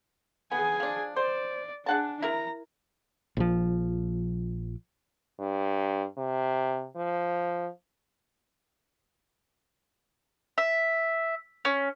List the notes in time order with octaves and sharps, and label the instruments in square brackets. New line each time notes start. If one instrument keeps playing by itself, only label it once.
[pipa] B3 [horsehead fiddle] G#4 G#5
[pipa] F3 D4
[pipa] C5 [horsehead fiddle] D5
[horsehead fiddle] D4 [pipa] G#4 F#5 A5
[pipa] E4 A#4 [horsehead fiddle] A#5
[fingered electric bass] A#1 F3
[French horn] G2
C3
F3
[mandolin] E5
C#4